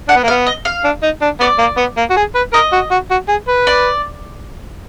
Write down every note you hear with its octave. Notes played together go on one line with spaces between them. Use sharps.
D4 F#5
B3
A#3
B3 F5
D#5
F5
D4
D#4
D4
B3 D5
A#3
B3
A#3
F#4
G#4
B4
A#4 D#5
F#4
F#4
F#4
G#4
B4
D5